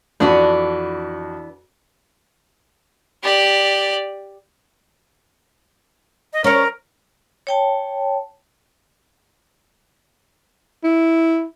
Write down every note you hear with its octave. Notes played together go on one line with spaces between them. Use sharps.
F2 E3 B3 D4 F#4
G4 D5
D#5
C#4 A#4 C#5
C#5 G5 A5
E4